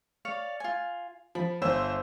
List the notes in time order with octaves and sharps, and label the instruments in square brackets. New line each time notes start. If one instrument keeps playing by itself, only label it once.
[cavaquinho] C#5 D5 F5
F4 G#5
[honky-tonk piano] F3 [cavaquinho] B5
[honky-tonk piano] G1 C5 E6 [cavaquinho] E5